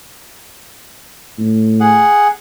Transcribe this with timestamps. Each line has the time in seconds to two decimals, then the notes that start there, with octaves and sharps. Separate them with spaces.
1.38 A2
1.80 G#4 F#5